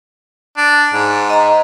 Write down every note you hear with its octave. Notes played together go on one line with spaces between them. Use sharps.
D4
G#2
D#5 A#5